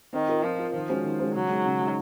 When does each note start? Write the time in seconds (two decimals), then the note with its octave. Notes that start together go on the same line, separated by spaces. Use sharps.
0.13 D#3 C4
0.28 F4 A#4
0.44 F3 C4
0.58 F4 A#4
0.74 D#3 F3
0.89 G#3 C#4 F#4 C5
1.04 D#3
1.19 G#3 C#4 F#4 C5
1.34 C#3 F#3
1.49 G#3 D#4
1.65 C#3
1.80 G#3 D#4